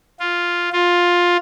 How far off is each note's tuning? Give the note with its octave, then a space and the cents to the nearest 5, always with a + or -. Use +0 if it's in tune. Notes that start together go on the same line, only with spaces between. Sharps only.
F4 +0
F4 +10